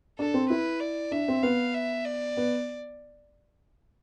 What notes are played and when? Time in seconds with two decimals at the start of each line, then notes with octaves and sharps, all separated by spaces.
0.19 D4 A4
0.34 C4
0.50 E4 B4
0.80 D5
1.12 D4 E5
1.28 C4
1.43 B3 F5
1.74 E5
2.05 D5
2.37 B3